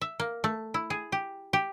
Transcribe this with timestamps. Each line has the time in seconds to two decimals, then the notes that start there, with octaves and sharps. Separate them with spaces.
0.01 E5
0.20 A#3
0.44 A3
0.74 E4
0.90 G#4
1.12 G4
1.53 G4